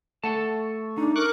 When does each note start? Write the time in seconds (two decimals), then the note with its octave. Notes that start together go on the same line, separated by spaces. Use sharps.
0.24 A3 A4 F#5 A5
0.98 D4 D#4
1.16 A#4 C#6 D6 F#6